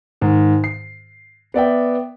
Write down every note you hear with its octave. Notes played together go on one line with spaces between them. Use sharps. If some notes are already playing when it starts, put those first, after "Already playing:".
G#2 D#3
C7
B3 D5 E5 G5